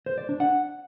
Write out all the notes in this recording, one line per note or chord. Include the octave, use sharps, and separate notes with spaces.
C5
D5
D4
F#5